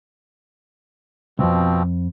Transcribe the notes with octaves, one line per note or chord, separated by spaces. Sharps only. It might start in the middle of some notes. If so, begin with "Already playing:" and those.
C2 F2 B2 F3 C4